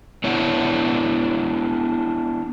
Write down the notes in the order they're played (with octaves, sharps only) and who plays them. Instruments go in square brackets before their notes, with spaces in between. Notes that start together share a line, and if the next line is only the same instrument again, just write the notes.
[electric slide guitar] B3 D4 E4 C#5 F#5